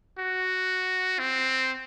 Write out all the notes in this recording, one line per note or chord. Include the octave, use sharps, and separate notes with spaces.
F#4
C4